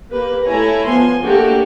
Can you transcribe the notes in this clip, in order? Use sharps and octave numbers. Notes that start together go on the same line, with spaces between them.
A#3 G4 B4
A3 E4 C#5 G#5 A#5
F3 B3 G#5 C6
A3 A#3 D4 F#4 G4